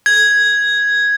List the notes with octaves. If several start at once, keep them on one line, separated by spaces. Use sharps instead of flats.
G#6